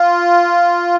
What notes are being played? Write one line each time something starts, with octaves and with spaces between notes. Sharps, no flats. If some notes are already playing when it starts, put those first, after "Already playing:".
Already playing: F4